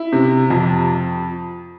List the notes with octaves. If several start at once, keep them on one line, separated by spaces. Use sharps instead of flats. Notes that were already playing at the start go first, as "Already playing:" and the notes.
Already playing: E4
C3
F2